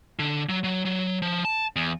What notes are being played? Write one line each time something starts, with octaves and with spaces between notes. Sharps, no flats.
D3
F#3
F#3
F#3
F3
A5
E2